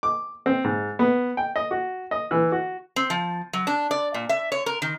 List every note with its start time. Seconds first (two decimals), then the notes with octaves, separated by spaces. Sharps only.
0.03 D6
0.46 C4
0.64 G#2
0.99 B3
1.37 G5
1.56 D#5
1.71 F#4
2.11 D#5
2.31 E3
2.52 F#4
2.96 C4
3.10 F3
3.53 F#3
3.67 D4
3.91 D5
4.14 A#2
4.29 E5
4.52 C#5
4.66 A#4
4.82 D#3